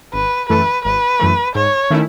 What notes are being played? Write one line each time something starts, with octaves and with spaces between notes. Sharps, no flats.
G#1 B4
F#2 E3 A3 B4
G#1 B4
F#2 E3 A3
G#2 C#5
D#3 A3 C#4 E4